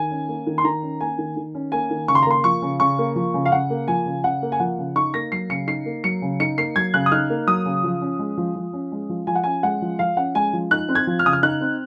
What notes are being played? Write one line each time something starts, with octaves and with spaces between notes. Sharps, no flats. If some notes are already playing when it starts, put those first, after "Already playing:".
Already playing: D#3 G#5
C#4
A#3
D#3
C6
D#3 A#5
C#4
A#3 G#5
D#3
D#3
C#4
A#3 G#5
D#3
C#3 C#6
C6
A#5
A#3 C6
F3 C#6
C#3
C#3 C#6
A#3
F3
C#3
F5
C#3 F#5
A#3
F3 G#5
C#3
C#3 F#5
A#3
G#5
F3 F#5
C#3
D#4 C#6
A#3 A#6
F#3 C7
C#3 C#7
D#4 C7
A#3
F#3 C#7
C#3
D#4 C#7
A#3 C7
F#3 G#6
C#3 F#6
D#6
D#4 F6
A#3
F#3 D#6
C#3
F3
C#4
G#3
F3
F3
C#4
G#3
F3
F3 G#5
F#5
C#4 G#5
G#3 F#5
F3
F3 F5
C#4 F#5
G#3 G#5
F3
D#4 F#6
C4
G#6
F3
F6
C#3 D#6
F6
D#4 F#6
C4